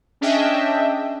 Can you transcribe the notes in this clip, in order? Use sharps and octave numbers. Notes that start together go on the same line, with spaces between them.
C#4 D4 G#4 D#5 E5 G5